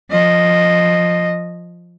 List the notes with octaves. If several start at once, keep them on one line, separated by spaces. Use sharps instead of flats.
F3 D#5